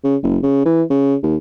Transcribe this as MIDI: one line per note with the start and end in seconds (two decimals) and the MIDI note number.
0.04 0.16 49
0.23 0.38 30
0.43 0.64 49
0.65 0.83 52
0.91 1.15 49
1.23 1.36 39